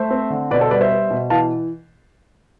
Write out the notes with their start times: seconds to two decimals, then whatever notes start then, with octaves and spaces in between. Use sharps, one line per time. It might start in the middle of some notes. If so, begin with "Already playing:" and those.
Already playing: A3 C5 E5
0.11 C4
0.30 D3
0.50 B2 B4 D5
0.60 A4 C5
0.71 G3 B4 D5
0.81 C5 E5
0.91 B3
1.11 B2
1.30 E3 F5 A5